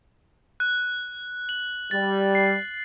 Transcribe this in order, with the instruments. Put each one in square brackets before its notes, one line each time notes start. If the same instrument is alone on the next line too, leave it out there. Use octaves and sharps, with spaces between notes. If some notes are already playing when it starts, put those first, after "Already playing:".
[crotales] F#6
F#7
[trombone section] G3 [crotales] A6
[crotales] C7